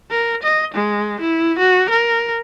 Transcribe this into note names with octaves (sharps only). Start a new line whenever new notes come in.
A#4
D#5
G#3
E4
F#4
A#4